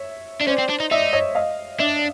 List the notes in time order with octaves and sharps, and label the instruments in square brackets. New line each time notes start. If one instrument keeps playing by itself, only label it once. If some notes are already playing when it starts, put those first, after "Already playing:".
Already playing: [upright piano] C#5 E5
[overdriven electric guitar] D4
[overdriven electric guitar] C#4 [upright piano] C5 D5
[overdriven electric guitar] C4
D4
D#4
[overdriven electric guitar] D#4 [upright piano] D5 E5
[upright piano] C#5 D#5
D#5 F5
[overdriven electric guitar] D4 [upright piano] D5 E5